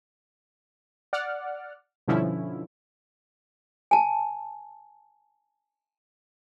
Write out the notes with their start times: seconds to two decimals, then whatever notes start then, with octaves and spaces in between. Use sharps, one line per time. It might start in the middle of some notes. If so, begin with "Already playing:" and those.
1.13 D5 F#5 F6
2.08 G2 B2 D3 F3 C#4 E4
3.91 G#5 A5